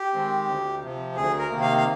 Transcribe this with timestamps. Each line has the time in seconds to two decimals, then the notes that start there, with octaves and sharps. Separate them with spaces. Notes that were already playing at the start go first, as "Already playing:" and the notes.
Already playing: G4
0.13 D#3 G#3 C4
0.49 D2
0.82 C3 F3
1.16 D2 G#4
1.39 A#4
1.50 C3 D#3 A#3
1.61 F5
1.77 F5